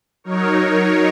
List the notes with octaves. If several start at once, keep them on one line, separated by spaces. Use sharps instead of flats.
F#3 D#4 A#4 C#5